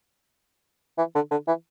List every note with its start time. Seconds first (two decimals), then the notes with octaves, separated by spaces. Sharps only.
0.98 E3
1.15 D3
1.31 D3
1.48 E3